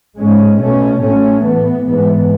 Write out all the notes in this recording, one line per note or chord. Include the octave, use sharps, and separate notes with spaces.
G#2 G#3 C#4
B2 A3 C#4
A2 F#3 A3 C#4
A2 E3 B3
G#2 E3 B3